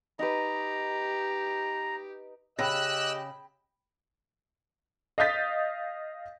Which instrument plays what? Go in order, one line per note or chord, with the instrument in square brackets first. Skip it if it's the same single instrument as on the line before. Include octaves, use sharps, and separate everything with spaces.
[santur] D#4 B4 [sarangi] G4 [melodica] A#5
[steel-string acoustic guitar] C#3 [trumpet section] G4 D#5 [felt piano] G5 B5 A#6 [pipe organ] E6 F#6
[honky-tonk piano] D#5 F5 D#6 G6 A6 B6